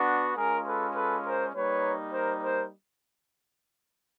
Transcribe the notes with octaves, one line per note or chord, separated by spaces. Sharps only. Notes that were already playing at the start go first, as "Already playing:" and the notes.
Already playing: B3 D4 F#4
G#3 C#4 F4 G#4 A#4
A4 B4
A4 B4
A#4 C5
G3 A#3 D#4 B4 C#5
A#4 C5
A#4 C5